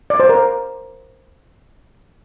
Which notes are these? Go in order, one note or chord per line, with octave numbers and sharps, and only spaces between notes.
D5
C5
A#4